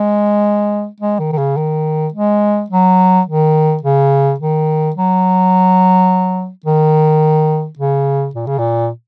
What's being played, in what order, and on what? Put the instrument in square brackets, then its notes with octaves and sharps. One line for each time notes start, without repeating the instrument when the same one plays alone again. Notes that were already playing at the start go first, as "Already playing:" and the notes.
Already playing: [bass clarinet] G#3
G#3
D#3
D#3
C#3
D#3
G#3
F#3
D#3
C#3
D#3
F#3
D#3
C#3
A#2
C#3
A#2